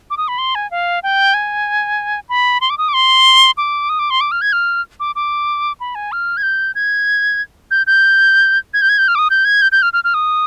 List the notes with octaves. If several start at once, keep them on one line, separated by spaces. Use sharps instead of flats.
D6
D#6
B5
C6
G#5
F5
G5
G#5
B5
C6
D6
D#6
D6
C6
D6
D#6
D6
C6
D6
F6
G#6
F6
D6
D6
B5
G#5
F6
G#6
G6
G#6
G6
G6
G#6
G6
G#6
G6
F6
D6
D#6
G6
G#6
G6
G6
F6
F6
F6
D#6